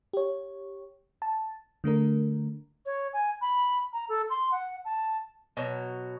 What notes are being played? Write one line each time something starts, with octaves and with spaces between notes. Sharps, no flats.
G4 C#5
A5
D3 A3 D4 A#4
C#5
G#5
B5
A#5
A4
C6
F#5
A5
B2 F#3